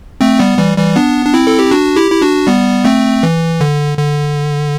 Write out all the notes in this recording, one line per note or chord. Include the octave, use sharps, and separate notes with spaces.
A3 C4
G3 B3
E3 G3
E3 G3
B3 D4
D4
C4 E4
A4
G4
D4 F#4
E4 G4
E4
D4 F#4
G3 B3
A3 C4
E3
D3
D3